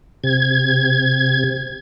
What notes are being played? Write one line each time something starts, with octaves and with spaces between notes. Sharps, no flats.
C3 G#6